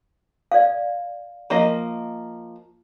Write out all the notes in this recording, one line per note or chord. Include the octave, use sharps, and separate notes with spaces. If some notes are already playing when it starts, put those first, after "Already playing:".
D5 F5
F3 A#3 D#5